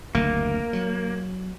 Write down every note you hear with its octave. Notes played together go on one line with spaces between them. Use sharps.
F#1 D2 C3 A#3
F#3